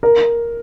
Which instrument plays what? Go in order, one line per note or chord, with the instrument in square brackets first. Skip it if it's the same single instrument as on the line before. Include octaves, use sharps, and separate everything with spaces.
[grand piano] A#4